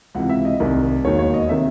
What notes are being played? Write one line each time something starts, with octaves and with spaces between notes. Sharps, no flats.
C#2 C3 E3 F#5
E5
D#5
C2 C3 D#3
E1 D#2 D#3 C#5
C#5
D#5
C3 D#3 E5